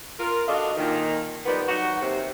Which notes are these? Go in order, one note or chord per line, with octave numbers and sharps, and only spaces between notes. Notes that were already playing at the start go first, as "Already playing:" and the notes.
F4 A#4
D4 F#4 A4 D#5 F5
A#2 D#3
D#3 F3 G3 B3
F#3 D#4 F#4
D#2 C3